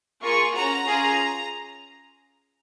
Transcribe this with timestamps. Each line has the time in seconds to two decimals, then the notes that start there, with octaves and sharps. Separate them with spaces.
0.22 A#3 F4 G#4 C#6
0.55 C#4 F#4 A#5
0.88 C#4 F4 G#4